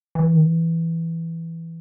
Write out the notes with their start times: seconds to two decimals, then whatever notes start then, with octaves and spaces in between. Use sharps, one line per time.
0.15 E3
0.33 D#3
0.42 E3